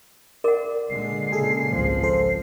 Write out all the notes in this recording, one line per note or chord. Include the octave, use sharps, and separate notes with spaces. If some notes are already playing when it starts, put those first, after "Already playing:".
A#4 D5 F#5
A#2 D3 G#3 C7
A#2 C#3 G#4 A4 G#5
G#1 C#2 F3
A4 C5